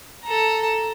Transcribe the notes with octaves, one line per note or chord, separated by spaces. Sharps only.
A4 A#5